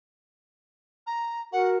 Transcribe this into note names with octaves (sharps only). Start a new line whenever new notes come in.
A#5
F#4 A#4 F#5